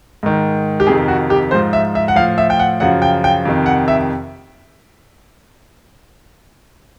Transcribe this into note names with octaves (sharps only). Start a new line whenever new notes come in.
G#2 D#3
G4
F2 C3 D#3 G#4
F#4
G4
G#2 F3 C5
E5
E5
F#5
A2 F3 F5
E5
G5
F#5
F#2 C#3 F3 F#5
G5
G5
F2 C3 D#3
F#5
E5